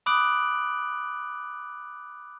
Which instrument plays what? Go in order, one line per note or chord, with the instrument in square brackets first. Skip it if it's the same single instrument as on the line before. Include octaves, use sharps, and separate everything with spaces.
[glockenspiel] B5 D6 D#6 F#6 D7 F#7